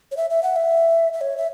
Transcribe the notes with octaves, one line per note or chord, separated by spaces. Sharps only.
C#5
E5
E5
F#5
E5
E5
C#5
E5